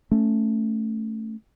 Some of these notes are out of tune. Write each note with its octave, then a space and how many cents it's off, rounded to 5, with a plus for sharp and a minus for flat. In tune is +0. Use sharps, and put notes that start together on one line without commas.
A3 +5 C#4 +0